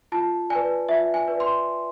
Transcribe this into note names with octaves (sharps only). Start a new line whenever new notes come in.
F4 A5
B4 D5 G#5
F4 E5
G#5
B4 D5
C6